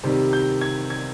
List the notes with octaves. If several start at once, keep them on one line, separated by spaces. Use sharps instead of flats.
C3 D#3 G3
G6
G#6
G#6